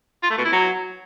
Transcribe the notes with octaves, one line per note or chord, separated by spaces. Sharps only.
F4
A3
B2
E4
F#3